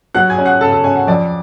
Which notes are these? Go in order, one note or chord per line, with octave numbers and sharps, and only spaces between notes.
F#3 F#5 F#6
G#5 G#6
C#4
F#5 F#6
C#3 A4 A5
A4 A5
C#4 G#5
F#5
F2 D5 D6